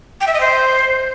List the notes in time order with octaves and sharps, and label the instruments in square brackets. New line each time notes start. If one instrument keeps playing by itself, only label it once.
[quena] G5
E5
D#5
C5